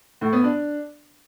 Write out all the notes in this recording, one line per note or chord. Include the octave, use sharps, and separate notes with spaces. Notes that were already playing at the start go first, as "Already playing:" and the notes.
A2
B3
D4